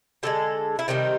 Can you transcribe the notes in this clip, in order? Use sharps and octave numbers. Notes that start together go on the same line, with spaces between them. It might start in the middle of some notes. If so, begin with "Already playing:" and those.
D3 F3 G#3 A4
E4
C3 D#3 G3 D#4